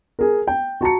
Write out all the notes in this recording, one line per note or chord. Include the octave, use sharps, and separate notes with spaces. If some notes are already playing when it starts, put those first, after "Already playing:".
G#4 A#4
G5
F#4 A5 A#5 C#7